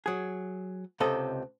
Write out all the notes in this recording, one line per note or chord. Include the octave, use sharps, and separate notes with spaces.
F#3 G#4
C#2 C3 A4 D#5